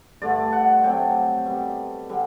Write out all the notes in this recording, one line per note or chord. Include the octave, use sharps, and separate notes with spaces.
G2 D3 A3 D5
F#5
C3 F#3 A3 G5
B2 G3
D3 G3